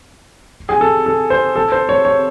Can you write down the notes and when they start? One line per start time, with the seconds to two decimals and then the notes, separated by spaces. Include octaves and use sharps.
0.69 G#4
0.81 A4
1.06 A4
1.30 C5
1.56 A4
1.72 C5
1.89 C#5
2.05 C#5